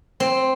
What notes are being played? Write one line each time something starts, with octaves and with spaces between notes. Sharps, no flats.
C4